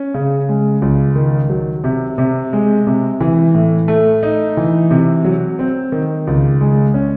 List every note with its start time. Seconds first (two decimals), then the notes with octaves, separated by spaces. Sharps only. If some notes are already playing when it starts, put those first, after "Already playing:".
Already playing: C#4
0.14 C#3
0.49 G#3
0.82 C#2
1.16 D#3
1.50 F#3
1.84 C3
2.18 C3
2.53 G#3
2.87 C3
3.20 E3
3.54 A2
3.88 A3
4.23 D#4
4.57 E3
4.91 C3
5.24 F#3
5.59 C4
5.92 D#3
6.27 C#2
6.61 G#3
6.94 C#4